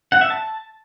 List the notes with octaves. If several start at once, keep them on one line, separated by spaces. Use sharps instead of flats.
F#5
E5
A5